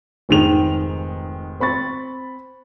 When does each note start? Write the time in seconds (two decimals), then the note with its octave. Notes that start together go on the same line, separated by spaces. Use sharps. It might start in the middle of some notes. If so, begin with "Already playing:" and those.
0.29 F1 G#2 D#3 G#3 F7
1.60 C4 B5 C#6 A6